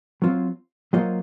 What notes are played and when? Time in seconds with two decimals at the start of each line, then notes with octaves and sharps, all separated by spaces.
0.22 F#3 C4 F4 C5
0.93 F#3 A#3 F4 C5 D#5